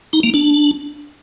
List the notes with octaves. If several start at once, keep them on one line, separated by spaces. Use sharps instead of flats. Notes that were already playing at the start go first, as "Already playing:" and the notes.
D#4
A#3
D4